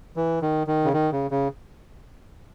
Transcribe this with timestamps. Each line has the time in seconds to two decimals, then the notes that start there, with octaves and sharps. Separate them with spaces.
0.16 E3
0.42 D#3
0.67 D#3
0.85 C#3
0.93 D#3
1.12 C#3
1.31 C#3